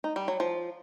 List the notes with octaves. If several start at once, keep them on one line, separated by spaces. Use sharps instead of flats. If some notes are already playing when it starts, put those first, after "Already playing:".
D#4
G3
F#3
F3